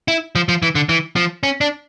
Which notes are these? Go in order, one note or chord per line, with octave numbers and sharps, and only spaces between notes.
E4
F3
F3
E3
D3
E3
F3
C#4
D4